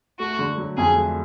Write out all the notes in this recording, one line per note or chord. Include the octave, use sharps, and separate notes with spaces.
A3 F#4
D3
F#3
F2 G#4
A3